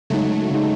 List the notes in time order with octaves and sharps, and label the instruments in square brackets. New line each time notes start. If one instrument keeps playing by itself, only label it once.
[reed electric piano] C#3 G#3 D#4 [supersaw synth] F#3 A3
[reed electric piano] C#3 G#3 D#4